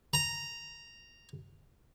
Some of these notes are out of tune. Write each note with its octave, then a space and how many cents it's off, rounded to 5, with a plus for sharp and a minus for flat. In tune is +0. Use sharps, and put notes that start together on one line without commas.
A#5 -5